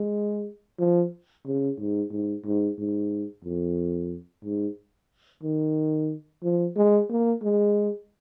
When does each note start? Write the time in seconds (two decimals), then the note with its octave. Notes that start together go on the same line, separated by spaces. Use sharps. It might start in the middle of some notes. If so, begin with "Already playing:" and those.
Already playing: G#3
0.79 F3
1.46 C#3
1.79 G#2
2.11 G#2
2.46 G#2
2.79 G#2
3.45 F2
4.44 G#2
5.43 D#3
6.43 F3
6.77 G#3
7.10 A#3
7.43 G#3